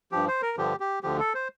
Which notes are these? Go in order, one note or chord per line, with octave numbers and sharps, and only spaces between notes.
G2 F3 G4
C5
A#4
G2 D3 F3 G4
G4
D2 D3 F3 G4
A4
C5